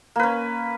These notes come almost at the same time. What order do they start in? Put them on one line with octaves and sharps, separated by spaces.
A#3 B4 C#4